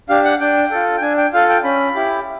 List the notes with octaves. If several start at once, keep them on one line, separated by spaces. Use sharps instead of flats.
D4 G4 F5
F#5
D4 G5
F4 A4
G5
D4 G#5
G5
F4 A4 F5
G5
C#4 B5
E4 G4